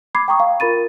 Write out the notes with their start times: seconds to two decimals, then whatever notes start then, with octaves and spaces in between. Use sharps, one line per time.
0.15 B5 D6 G#6 C7
0.28 G5 A#5 C#6 D#6
0.40 F5
0.60 F4 A#4 B5 A6 D#7